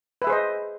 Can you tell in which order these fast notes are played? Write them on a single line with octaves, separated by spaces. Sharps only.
B4 E5 G#4 C5 D#5